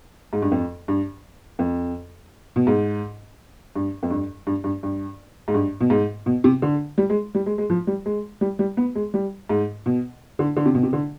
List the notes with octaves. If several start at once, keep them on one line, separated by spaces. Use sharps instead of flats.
G#2
G2
F2
G2
F2
B2
G#2
G2
F2
G2
G2
G2
G2
G#2
G2
B2
G#2
B2
C3
D3
G3
G#3
G3
G#3
G#3
F3
G3
G#3
G3
G3
B3
G#3
G3
G#2
B2
D3
D3
C3
B2
C3
D3